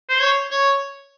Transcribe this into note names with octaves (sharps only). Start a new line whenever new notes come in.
C5
C#5
C#5